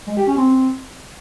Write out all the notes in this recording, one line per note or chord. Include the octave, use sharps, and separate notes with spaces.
G#3
G4
C#4
C4